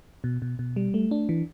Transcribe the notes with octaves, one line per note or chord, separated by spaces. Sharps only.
B2
B2
B2
G3
A3
D4
E3